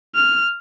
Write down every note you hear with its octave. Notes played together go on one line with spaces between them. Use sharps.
F6